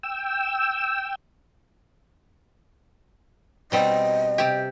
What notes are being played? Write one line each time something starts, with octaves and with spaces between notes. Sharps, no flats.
G5 E6
B2 G3 C4 D#5
C3 G4